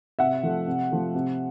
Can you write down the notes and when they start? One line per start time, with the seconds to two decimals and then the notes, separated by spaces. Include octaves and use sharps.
0.19 C3 E5 F#5
0.43 F3 A3
0.67 C3
0.91 F3 A3
1.15 C3